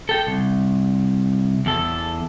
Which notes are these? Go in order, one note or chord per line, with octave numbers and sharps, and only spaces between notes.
A4 G5
C2
E2 A4